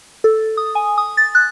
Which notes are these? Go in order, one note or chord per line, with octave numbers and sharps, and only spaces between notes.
A4
D#6
G#5
D#6
A6
F#6